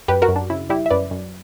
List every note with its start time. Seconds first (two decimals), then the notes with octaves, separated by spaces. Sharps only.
0.08 F#2 G4 B4
0.22 F#4 A#4
0.28 F#2
0.36 D4
0.50 C#3 E4
0.69 G3 E4 G4
0.86 E5
0.91 F#2 B4 D5
1.11 F#2